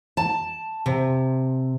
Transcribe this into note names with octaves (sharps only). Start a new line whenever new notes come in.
A5
C3